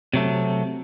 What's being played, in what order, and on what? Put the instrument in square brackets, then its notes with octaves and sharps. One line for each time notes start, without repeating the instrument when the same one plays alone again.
[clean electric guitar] C3 F#3 A3